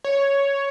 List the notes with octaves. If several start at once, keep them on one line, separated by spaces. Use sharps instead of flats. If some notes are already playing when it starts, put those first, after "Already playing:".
C#5